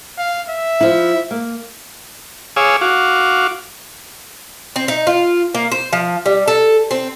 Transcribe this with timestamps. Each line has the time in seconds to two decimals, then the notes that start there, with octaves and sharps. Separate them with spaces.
0.18 F5
0.50 E5
0.81 F3 E4
1.31 A#3
2.56 G#4 C#5 F5 G#5 D6 E6
2.82 F#4 F5 D6
4.76 C4
4.88 D#4
5.07 F4
5.55 A#3
5.72 C5
5.93 F3
6.26 G3
6.48 A4
6.91 C4